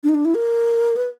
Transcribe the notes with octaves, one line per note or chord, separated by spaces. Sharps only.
D4
D#4
D4
E4
A#4
B4